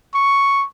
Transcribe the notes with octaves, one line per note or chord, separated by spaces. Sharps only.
C#6